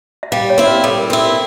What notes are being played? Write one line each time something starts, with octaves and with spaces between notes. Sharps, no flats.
E5
G3 F5
C#5
C4 E4
B4
G3 A4
A#4
C4 E4 A4